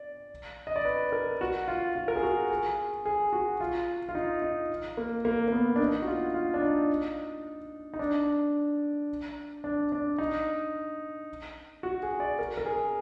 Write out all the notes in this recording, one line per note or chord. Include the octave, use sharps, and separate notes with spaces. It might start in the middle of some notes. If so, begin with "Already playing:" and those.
Already playing: D5
D#5
D5
B4
A#4
F#4
F4
F4
A#4
G#4
F#4
G#4
G#4
F#4
F4
F4
D#4
D#4
A#3
A#3
A#3
B3
D4
D#4
F#4
F4
F4
D4
D#4
D#4
D4
D4
D4
D#4
F#4
G#4
D5
A#4
A#4
G#4